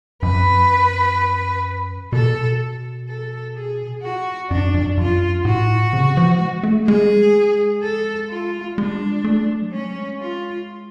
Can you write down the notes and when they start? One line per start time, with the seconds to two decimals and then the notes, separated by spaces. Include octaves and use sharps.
0.23 F#2 B4
2.12 B2 A4
3.08 A4
3.56 G#4
4.02 F#4
4.50 F#2 D4
4.74 F#2
4.97 F#2 F4
5.45 A2 F#4
5.93 C#3
6.17 F3
6.40 G#3
6.63 A3
6.87 G#3 G#4
7.83 A4
8.30 F4
8.78 G#3 D4
9.24 A3
9.62 F#3
9.73 G#3 C#4
10.20 F4